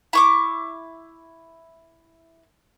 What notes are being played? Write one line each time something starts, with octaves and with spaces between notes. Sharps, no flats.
E4 C#6 D6